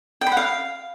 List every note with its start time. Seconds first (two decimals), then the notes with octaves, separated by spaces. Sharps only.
0.21 G5
0.27 B5
0.32 F#5
0.37 F5